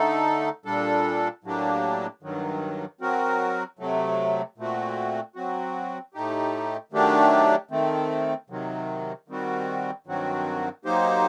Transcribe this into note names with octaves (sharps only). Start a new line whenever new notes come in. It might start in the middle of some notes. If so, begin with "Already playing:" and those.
Already playing: D3 A3 D#4 A4
A#2 G3 D4 A4
A2 F#3 A#3 D4 G4
G2 D#3 F#3
F#3 C4 F#4 A#4
C3 F#3 A3
A#2 A3 C4 F#4
F#3 C4 F#4
A2 A3 D#4 G4
D#3 F#3 A3 D4 G4
D#3 A3 C4
C3 D#3 F#3
D#3 G3 C4 F#4
G2 D#3 F#3 C4 F#4
F#3 A#3 D#4 G4 C5